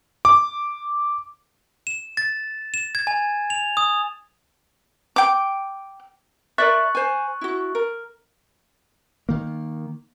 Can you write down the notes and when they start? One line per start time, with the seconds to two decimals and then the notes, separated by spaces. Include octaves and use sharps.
0.25 D6
1.87 E7
2.17 A6
2.74 E7
2.95 G#6
3.07 G#5
3.50 F7
3.77 D#6
5.16 G5 D6
6.58 A#4 D5 E5 C#6 F#6 A6
6.95 C5 G#5
7.41 E4 F#4
7.75 A#4
9.29 D#3 A#3